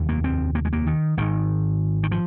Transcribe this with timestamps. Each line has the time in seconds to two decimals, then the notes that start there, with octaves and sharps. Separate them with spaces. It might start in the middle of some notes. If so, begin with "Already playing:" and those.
Already playing: F1 D#2
0.09 A#3
0.24 C4
0.55 A#3
0.65 G#3
0.73 A#3
0.87 D#3
1.17 G#1 G#2 D#3
2.03 D#3
2.12 F3